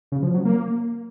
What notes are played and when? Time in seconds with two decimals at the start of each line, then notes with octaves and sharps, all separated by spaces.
0.12 C#3
0.22 F3
0.34 F#3
0.45 A#3